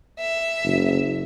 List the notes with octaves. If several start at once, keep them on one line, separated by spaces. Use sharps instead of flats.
E5
F#1